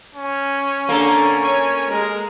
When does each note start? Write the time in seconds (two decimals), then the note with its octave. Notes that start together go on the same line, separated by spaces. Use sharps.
0.15 C#4
0.89 D3 A#3 A4
1.40 C#5 G#5
1.91 G#3 A#4